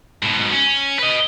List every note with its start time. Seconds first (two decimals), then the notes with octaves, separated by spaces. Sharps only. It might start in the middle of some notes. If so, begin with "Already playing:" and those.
0.23 G#2 B2
0.52 C#4
0.99 B4 D#5